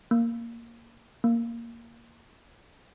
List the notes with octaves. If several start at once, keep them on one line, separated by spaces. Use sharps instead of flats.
A#3
A#3